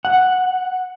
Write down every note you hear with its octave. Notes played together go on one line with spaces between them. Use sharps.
F#5